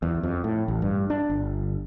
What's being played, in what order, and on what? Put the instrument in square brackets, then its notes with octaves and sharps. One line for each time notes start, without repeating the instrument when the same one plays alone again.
[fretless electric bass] E2
F2
A2
A1
G2
D4
G1